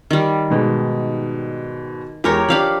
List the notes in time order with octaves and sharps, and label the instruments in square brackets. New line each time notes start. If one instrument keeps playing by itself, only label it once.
[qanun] D#3 G3
[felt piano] G#2 B2 G#3
[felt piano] E2 G#3 [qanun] G4 A#4 C#5
[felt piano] F3 D4 [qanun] G4 F5 B5